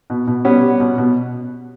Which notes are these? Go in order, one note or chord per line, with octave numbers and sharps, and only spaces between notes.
B2
B2
G3 B3 C#4
G3
B2
B2